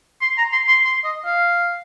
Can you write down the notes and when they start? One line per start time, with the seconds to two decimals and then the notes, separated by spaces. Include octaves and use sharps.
0.22 C6
0.38 A#5
0.53 C6
0.68 C6
0.84 C6
1.05 D#5
1.26 F5